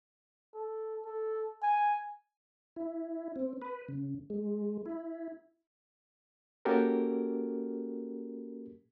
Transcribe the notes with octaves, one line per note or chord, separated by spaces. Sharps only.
A4
A4
G#5
E4
C4
B4
C#3
G#3
E4
A#3 C#4 F#4 G4 A4 A#4